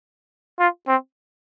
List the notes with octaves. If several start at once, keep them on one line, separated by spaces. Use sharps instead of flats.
F4
C4